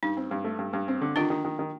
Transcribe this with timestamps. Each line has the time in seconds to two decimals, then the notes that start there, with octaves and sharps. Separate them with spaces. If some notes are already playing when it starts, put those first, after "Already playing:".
0.03 G2 D#4
0.17 C4
0.31 G2
0.44 A3
0.59 G2
0.73 G2
0.88 C4
1.01 D3
1.16 D#3 D4 F4
1.30 D#3
1.45 D#3
1.59 D#3